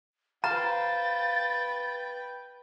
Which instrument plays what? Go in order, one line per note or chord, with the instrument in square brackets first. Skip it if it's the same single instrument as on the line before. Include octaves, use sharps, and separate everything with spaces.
[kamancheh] B4 G5 [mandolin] C5 F5 [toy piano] A#5 [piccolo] A6